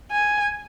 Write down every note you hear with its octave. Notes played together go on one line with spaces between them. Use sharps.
G#5